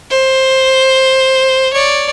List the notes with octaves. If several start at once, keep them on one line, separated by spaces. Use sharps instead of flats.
C5
C#5 D5